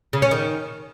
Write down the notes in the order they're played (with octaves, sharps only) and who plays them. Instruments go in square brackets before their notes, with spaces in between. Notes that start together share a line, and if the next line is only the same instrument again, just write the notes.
[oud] C#3
C#4
D#3